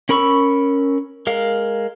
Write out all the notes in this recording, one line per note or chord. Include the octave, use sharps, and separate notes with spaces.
C#4 A#4 B5 C#6 E6
G#3 A#4 F5